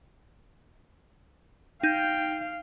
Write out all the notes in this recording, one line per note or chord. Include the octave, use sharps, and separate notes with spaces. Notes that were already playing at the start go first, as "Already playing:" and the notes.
D#4 F5 G5 G6